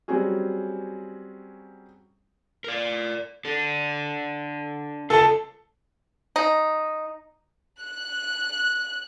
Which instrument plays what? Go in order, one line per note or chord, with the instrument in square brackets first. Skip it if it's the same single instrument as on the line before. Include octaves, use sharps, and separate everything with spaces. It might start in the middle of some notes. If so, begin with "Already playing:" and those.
[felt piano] F#3 G3 C4 C#4 F#4 G#4
[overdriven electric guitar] A#4 D5
D4 A4
[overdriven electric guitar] C#3 F4 [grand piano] A4 A5
[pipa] D#4
[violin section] F#6